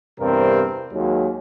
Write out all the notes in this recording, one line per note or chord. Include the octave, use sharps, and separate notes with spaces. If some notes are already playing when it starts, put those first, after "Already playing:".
E2 G2 C3 G3 C4 A#4
D#2 F#3 G#3